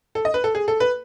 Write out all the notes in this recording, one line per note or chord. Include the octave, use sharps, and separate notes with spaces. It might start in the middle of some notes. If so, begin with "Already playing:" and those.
A4
D#5
B4
A4
G#4
A4
B4